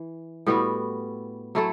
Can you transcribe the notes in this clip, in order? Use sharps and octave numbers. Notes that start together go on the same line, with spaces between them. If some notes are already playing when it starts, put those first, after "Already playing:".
Already playing: E3
A2 G3 B3 F#4
F#3 A3 E4 A4